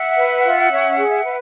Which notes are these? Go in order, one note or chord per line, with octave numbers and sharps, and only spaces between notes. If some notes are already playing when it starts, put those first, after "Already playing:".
Already playing: E5 F#5
B4
F4
C#4
G#4
B4